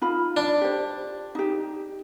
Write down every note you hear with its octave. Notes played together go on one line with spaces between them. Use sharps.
D#4 F4 B5
D4
G4 C5
D#4 G4